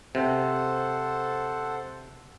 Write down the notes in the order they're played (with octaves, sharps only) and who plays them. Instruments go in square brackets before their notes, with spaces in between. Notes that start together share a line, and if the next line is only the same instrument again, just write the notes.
[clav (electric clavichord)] C3 [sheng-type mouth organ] A4 C5 F#5